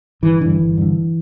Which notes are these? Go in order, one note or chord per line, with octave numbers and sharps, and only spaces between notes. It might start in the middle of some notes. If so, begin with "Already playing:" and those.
G1 E3
G2 D3 E3
G1
G2 D3